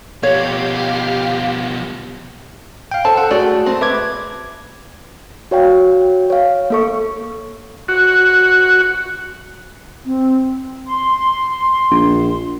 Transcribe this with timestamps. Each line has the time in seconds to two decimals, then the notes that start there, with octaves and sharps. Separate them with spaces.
0.23 B2 F3 G4 C#5 F5
2.91 F5 G5
3.05 A4 C5 A5
3.17 A4 F#5
3.31 A3 F#4 G#4 D5
3.66 A3 A#3 C4
3.81 B4 E5 D6 G#6
5.51 F#4 C#5 F5 G5
6.30 C#5 F5
6.70 A#3 A4 C#6
7.88 F#4
10.05 C4
10.87 C6
11.91 A#1